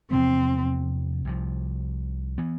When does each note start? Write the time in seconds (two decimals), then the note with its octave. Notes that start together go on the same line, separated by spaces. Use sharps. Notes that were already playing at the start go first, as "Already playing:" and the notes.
0.11 E2 C3 F3 B3 C4
1.25 C2 C3 F3
2.38 E3 B3